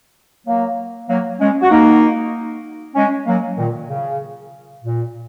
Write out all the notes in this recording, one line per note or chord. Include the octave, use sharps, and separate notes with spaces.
F#3 A#3
F#3 A#3
G#3 C#4
F#4
A#3 D#4
G#3 C#4
F#3 A#3
A#2 D#3
C#3
A#2